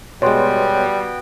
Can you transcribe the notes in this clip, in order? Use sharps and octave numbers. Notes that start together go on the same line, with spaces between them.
B2 G3 G#3 B3 F#4 C#5 G5 C6